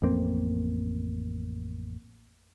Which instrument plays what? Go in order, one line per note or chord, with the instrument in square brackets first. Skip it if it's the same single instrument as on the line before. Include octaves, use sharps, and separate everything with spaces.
[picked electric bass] A1 F2 A#3 C4